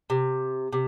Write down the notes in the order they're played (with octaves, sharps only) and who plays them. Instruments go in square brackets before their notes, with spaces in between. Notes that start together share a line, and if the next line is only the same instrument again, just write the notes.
[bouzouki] C3
C3